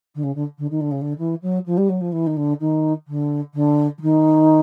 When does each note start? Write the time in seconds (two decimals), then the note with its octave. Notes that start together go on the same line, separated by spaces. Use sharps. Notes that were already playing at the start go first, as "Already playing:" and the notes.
0.15 D3
0.23 C#3
0.35 D3
0.58 D3
0.70 D#3
0.81 D3
0.91 C#3
1.01 D3
1.18 E3
1.42 F#3
1.66 F3
1.77 G3
1.89 F#3
2.01 F3
2.12 E3
2.26 D#3
2.37 D3
2.60 D#3
3.07 D3
3.54 D3
3.98 E3
4.01 D#3